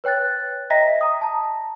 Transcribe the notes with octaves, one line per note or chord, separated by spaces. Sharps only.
B4 C#5 G5 F#6 A6
D#5 E5 G5 A#5 A#6 B6
A#5 D#6
A5 A#5